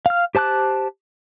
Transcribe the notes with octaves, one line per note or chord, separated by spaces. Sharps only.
F5 F6
G4 C5 A5 D6 F#6